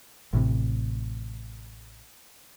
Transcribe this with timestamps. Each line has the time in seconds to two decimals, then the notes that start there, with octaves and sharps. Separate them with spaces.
0.33 A1 A2 C3